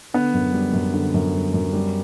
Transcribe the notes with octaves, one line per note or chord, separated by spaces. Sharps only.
D3 B3
F#2
G3
F#2
D3
F#2
G3
F#2
G3